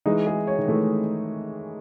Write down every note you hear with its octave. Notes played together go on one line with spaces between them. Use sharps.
E3 G#3 D#4
G#4
C#5
D#3
E3 A3